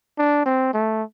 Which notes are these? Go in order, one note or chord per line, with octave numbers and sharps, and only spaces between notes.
D4
C4
A3